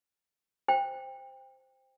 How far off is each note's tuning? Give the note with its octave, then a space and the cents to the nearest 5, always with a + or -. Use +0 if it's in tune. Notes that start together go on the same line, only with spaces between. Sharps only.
C5 +0 G5 +20